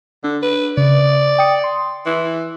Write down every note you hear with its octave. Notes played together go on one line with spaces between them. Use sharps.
D3 D4
B4
C#3 D5
G5 D#6 C#7
C6
E3